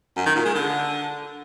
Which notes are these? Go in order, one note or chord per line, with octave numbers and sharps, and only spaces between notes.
F#2
D#3
A#2
G#3
D3